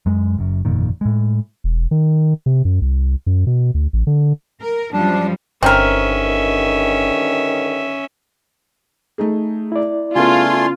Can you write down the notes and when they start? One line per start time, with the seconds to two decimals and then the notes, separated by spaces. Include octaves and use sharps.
0.06 F#2 G#3
0.37 F#1 F#2
0.65 G1 F2 A#2 D#3
1.01 A2 G#3
1.64 E1
1.91 D#3
2.46 C3
2.65 F#2
2.82 C2
3.26 F#2
3.47 B2
3.74 D2
3.93 A1
4.07 D3
4.61 A#4
4.93 F#2 F3 G3 D4
5.63 G1 G2 D3 D#3 C4 C#4 A#4 E5
9.18 A3 D#4 G#4
9.72 E4 D5
10.15 C#3 A3 B3 F4 G#5 C6